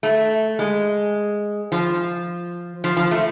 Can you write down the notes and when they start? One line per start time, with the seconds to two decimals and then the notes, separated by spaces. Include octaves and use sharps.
0.03 A3
0.59 G#3
1.72 F3
2.84 F3
2.97 F3
3.11 A3